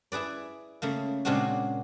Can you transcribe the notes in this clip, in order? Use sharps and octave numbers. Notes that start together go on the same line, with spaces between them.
E4 G#4 B4 D5
C#3 A3 A#3
A#2 C#3 G#3 C4 D4 F#4